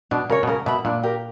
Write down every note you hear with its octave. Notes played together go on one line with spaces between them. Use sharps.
B2 D4
C#3 A#4 C#5
B2
C#3 A#4
B2 E5 B5
A#2 D4
G4 A#4